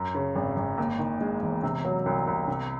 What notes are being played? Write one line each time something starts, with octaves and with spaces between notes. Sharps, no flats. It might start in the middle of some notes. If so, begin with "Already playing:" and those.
Already playing: F#2
C#3
G#1
G#1
D#2
D#3
G#3
E1
C3
F#3
C2
C2
C3